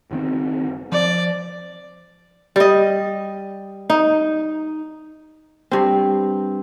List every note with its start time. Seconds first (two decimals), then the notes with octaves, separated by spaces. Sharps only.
0.11 F#1 D#3 C4
0.92 F3 D5
2.56 G3 D#5
3.90 D#4
5.71 G2 C4